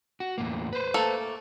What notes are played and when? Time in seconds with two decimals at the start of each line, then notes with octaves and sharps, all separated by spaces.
0.20 F#4
0.38 E2 A2 A#3
0.73 B4 C5
0.94 A3 A#3 A4